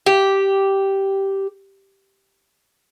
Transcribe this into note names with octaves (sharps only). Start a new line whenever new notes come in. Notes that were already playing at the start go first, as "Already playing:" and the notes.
G4